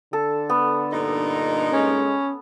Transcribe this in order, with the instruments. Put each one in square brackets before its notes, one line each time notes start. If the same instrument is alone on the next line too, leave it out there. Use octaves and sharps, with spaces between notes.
[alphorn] D3 [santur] A4
[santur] B3
[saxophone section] G2 A#2 D#4
[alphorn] G#3 [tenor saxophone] C#4